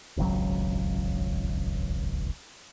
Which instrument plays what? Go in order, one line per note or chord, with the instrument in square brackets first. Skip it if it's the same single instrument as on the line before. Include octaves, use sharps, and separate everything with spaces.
[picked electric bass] D#1 G#1 C#2 F#3